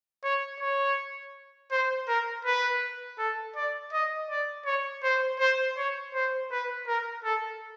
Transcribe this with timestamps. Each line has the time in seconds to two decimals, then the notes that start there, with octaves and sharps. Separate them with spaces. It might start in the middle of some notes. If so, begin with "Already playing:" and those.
0.24 C#5
0.61 C#5
1.71 C5
2.08 A#4
2.45 B4
3.19 A4
3.56 D5
3.93 D#5
4.30 D5
4.66 C#5
5.03 C5
5.40 C5
5.78 C#5
6.14 C5
6.51 B4
6.87 A#4
7.24 A4